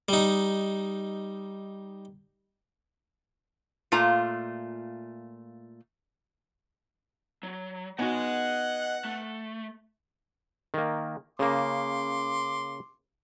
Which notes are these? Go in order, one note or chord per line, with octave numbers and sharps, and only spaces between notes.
G3 D#4
A#2 A3 F4 A#5
F#3
B3 D#4 F#4 D#5 F#5 G#5
A3
D#3 A#3
C#3 A#3 C6 D6